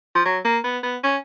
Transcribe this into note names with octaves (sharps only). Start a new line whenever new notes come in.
F3
F#3
A#3
B3
B3
C#4